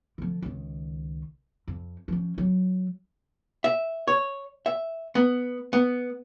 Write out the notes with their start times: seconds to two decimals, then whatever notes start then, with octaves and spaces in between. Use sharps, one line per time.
0.18 D3 F3
0.42 C#2 D#3
1.67 F2
2.08 F3 C#4
2.38 F#3
3.64 E5
4.08 C#5
4.66 E5
5.15 B3
5.73 B3